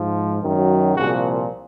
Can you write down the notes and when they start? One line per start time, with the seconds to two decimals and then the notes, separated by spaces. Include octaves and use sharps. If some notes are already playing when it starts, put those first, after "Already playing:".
Already playing: G#2 F3
0.42 F#2 D#3 F#3
0.94 C2 A#2 F3 F#4 G#4